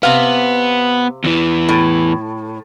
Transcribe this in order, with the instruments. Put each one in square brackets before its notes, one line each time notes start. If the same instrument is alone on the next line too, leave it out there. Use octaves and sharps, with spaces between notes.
[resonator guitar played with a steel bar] C3 F5 [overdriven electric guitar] B3
[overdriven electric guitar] E2 E3
[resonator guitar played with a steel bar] A2